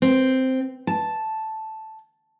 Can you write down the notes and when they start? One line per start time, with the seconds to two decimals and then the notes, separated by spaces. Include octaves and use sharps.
0.02 C4
0.87 A5